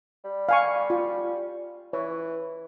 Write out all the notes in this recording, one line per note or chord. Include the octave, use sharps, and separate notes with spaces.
G3
F5 G#5 C#6
F4
E3 C#5